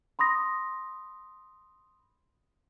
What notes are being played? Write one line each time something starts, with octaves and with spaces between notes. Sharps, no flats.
B5 C6 D#6 A#6